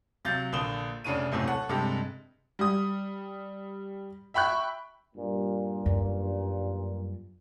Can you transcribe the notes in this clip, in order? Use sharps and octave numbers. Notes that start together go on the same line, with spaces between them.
C3 F#3 F5 G6 A6
A#1 D3 A#3 D#6 E7 G7
F1 C#3 D4 C#5 D#7
D#1 F#2 A2 C3
A4 C#5 F#5
G2 C3 G#3 G4 A4
G3 D#6
E5 G5 B5 C#6 F#6
G2 A#2
F#2